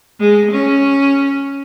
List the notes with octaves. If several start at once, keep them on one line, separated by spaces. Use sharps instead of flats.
G#3
C#4